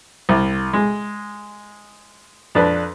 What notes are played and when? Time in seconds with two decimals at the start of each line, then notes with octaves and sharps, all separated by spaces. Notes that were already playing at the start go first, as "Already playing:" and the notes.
0.29 C2
0.73 G#3
2.55 F2 D4 B4